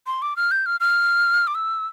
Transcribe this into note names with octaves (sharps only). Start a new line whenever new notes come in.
C6
D6
F6
G6
F6
F6
D6
E6